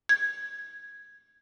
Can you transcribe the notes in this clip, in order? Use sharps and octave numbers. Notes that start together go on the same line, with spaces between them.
G#6